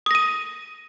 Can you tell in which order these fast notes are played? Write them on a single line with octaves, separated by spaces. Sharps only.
D#6 A#6 D#7